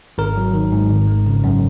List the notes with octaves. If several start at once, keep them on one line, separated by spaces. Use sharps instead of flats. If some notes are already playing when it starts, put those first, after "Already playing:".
G#1 A#4
F#3
D#3
G#2
G#1
G#3
C#3
F#2